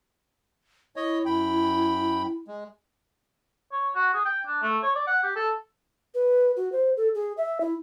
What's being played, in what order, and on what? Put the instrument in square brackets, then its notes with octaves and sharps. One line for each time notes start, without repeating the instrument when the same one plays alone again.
[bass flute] E4 [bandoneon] C#5 D#5
[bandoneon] F#2 G5 B5
G#3
[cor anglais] C#5
F#4
G#4
G5
D4
A3
C#5
D5
F#5
G4
A4
[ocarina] B4
F#4
C5
A4
G#4
E5
E4